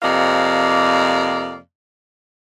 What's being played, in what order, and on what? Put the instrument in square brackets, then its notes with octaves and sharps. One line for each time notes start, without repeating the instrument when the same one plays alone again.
[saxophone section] F2 C3 A#3 D5 D#5 F5